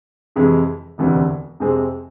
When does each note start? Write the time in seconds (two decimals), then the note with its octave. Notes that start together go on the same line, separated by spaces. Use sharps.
0.36 F2 C3 E3 G#3
0.98 E1 D2 C3 E3
1.60 F2 C3 G#3 C4 G#4